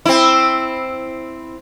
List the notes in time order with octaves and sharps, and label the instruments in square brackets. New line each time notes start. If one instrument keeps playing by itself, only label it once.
[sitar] C4 E4